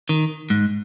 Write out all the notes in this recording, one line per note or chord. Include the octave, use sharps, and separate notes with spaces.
D#3
G#2